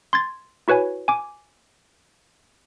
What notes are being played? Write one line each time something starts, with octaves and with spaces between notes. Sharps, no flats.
C6 G#6 A6
E4 F#4 B4 C#5 G#5
G#5 D6